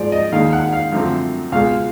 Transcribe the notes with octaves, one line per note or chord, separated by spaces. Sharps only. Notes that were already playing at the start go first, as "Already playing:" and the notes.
Already playing: G#2 F3 G#3 D5
D#5
D#2 D#3 G#3 F5
F#5
F5
F#2 D3 F3 A3 C4
C#2 B2 G#3 F5